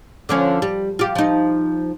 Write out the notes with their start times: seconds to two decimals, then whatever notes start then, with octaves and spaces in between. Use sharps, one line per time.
0.29 D3 F3 C#4
0.62 G3
0.99 F4 G4
1.15 F3 D#4